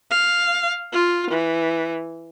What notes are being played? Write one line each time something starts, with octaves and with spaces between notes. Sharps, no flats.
F5
F4
E3